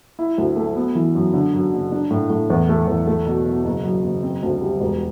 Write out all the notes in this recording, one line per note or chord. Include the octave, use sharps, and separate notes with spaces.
E4
D2
A3
B3
E3
F#2
D3
F#2
F#1
D4
A2
A2
E2
A3
E2
A3
B2
B2
F#1
F#2
F#1
C4
D2
G3
E1